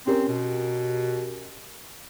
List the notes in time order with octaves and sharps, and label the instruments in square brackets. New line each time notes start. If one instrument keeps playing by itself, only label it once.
[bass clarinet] C4 [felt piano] C#4 G4 A#4
[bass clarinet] B2